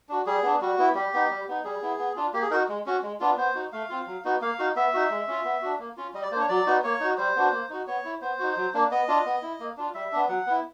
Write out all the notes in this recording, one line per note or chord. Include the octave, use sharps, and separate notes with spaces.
D4 F#4
G3 G#4
B3 D4
G3 F#4
B3 E4
G3 G4
B3 D#4
G3
B3 D#4
G3 G#4
B3 E4
B3
D4 F4
A#3 G4
G#4
D#4 F#4 A#4
G#3
C#4 F#4
G#3
B3 D4 F4
B3 C5
D#4 F#4
A3 F5
C4 F4
F#3
B3 D#4 F#4
A#3 F5
D#4 F#4
B3 E5
D#4 F#4
G#3
C#4 F4
B3
D4 F#4
A#3
C#4 F4
G3 D#5
D5
A#3 D4 C5 C#5
F#3 D5
B3 D#4 F#4
A#3 C#5
D#4 F#4
G3 C5
B3 D4 F#4
A#3
D#4 F#4
B3 C#5
E4
B3 C5
D#4 F#4
F#3
A#3 D4
B3 D#5
D4 F4
B3
E4
A#3
D4 F4
G3 E5
B3 D4
F#3 F#5
B3 E4